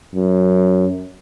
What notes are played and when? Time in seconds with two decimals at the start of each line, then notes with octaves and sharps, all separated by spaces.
0.15 F#2